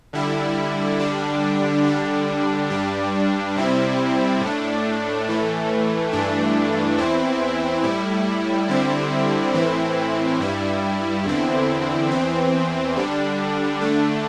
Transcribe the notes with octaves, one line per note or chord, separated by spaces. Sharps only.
D3 G3 E4
D3 G3 D4
D3 G3 D4
G2 G3 D4
C3 G3 C4 E4
A2 A3 D4
A2 E3 A3
G2 E3 A3 D4
E2 E3 C4 E4
A2 G3 E4
D3 G3 C4 E4
A2 E3 C4 E4
G2 G3 E4
E2 D3 C4 E4
E2 E3 C4
D3 G3 D4
D3 A3 D4